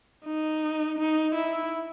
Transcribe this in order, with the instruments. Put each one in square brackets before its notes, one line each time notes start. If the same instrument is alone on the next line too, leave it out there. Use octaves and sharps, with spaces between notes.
[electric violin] D#4
D#4
E4